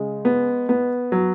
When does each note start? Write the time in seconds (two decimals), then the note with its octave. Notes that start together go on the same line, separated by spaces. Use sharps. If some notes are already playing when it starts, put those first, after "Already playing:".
Already playing: C#3 G#3
0.25 B3
0.69 B3
1.12 F#3